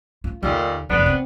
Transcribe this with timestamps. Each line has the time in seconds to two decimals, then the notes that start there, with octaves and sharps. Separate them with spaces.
0.24 F4
0.43 D#2 A#2 D3 D#3 G3
0.89 F1 F3 B3 D4
1.06 C4